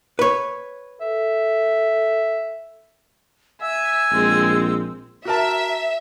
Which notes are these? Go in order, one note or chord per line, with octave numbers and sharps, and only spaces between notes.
B4 C#5
A4 E5
E5 G#5 E6
A#1 G#3 C4
F#4 A#4 E5 A5